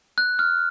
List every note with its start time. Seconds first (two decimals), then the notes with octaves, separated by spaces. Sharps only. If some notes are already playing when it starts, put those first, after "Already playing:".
0.18 F#6
0.39 F6